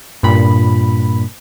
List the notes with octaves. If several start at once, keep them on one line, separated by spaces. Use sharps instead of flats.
G2 A#2 B5